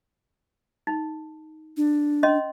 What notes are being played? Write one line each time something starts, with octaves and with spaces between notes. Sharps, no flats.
D#4
D4
C#4 D#5 C6